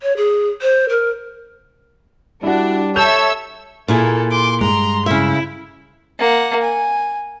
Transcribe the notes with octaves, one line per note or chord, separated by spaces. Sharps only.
C#5
G#4
C5
A#4
G3 D4 E4 F#4
A4 C#5 E5 A5 E6 G6 F7
A#2 A#3 E4 G#4 A4
C6 D6
G2 G#3 A#5 C6
C#3 E4 E5
A#3 F#5
G#5